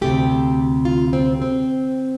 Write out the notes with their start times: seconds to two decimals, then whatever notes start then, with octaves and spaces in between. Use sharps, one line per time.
0.01 D2 C3 A3 G4
0.85 F4
1.13 C4
1.42 C4